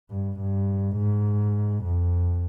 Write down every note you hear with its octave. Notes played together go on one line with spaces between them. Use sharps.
G2
G2
G#2
F2